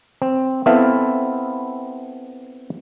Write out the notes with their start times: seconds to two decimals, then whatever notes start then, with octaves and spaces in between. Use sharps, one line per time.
0.22 C4
0.66 B3 C4 E4 A4 E5 F5